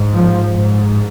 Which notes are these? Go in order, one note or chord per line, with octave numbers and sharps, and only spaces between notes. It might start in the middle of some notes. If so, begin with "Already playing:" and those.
Already playing: G#2
F3
G#2